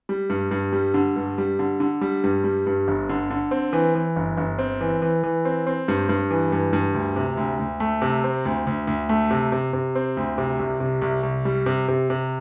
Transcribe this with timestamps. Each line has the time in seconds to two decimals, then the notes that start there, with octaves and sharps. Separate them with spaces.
0.09 G3
0.30 G2
0.51 G2
0.73 G3
0.94 D3
1.16 G2
1.38 G3
1.59 D3
1.80 D3
2.01 G3
2.24 G2
2.44 G3
2.67 G2
2.88 G1
3.09 D3
3.30 D3
3.51 C4
3.73 E3
3.95 E3
4.16 G1
4.38 G1
4.59 C4
4.81 E3
5.02 E3
5.23 E3
5.45 C4
5.67 C4
5.88 G2
6.09 G2
6.31 E3
6.52 G2
6.73 G2
6.94 D2
7.16 C3
7.37 D2
7.59 D2
7.80 A3
8.02 C3
8.24 C4
8.45 D2
8.67 D2
8.87 D2
9.09 A3
9.31 C3
9.52 C3
9.73 C3
9.95 C4
10.17 D2
10.38 C3
10.59 C2
10.80 C3
11.02 C2
11.23 C2
11.45 G3
11.66 C3
11.88 C3
12.10 C3